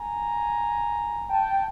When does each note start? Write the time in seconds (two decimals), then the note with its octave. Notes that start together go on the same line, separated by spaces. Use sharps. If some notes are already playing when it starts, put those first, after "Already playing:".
Already playing: G#5 A#5
1.30 G5 A5